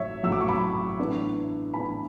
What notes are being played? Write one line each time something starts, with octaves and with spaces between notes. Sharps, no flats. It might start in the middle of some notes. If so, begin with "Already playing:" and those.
Already playing: A1 A2 F#3 C#5 E5
A1 A2 F#3 E6
D6
C#6
B5 D6
A2 E3 B3 D4
A2 E3 B3 D4 G#5 B5